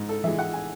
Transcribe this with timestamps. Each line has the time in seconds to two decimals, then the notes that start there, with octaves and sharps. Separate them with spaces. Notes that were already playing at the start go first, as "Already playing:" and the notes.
Already playing: G#2
0.09 A4
0.24 E3 E5
0.27 G#3
0.39 F#5
0.54 G#5